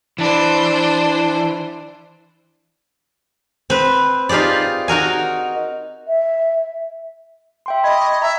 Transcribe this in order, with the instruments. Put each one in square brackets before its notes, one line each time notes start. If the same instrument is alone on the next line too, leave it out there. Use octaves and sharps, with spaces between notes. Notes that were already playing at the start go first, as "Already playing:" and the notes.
[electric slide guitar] E3 [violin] D4 C5
[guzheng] C4 B4
D#4 F4 G4 G#4 D5
D#4 F#4 A#4 G#5
[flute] E5
[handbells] E5 G5 C6
[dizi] D#5 [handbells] B5 G#6
[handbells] C#6
[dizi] E5 [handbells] A#5